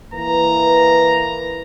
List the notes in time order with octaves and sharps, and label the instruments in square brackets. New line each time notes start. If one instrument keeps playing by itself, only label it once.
[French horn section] E3 A#3 B4 [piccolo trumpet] A#5